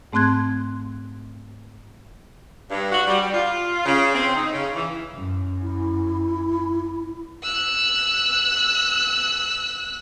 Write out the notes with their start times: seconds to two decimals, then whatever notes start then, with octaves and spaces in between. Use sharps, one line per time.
0.13 G#2 A3 C4 C6 F#6 G#6
2.71 G2
2.92 F#4
3.07 G3
3.21 G3
3.34 F4
3.85 C#3
4.15 C4
4.36 D#4
4.53 C#3
4.75 E3
5.13 F#2
5.62 E4
7.43 E6 F#6